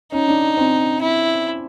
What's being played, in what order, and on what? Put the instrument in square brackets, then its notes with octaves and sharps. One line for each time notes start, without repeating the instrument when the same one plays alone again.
[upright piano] C#4 [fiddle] D#4
[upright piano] D4
C4
[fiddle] E4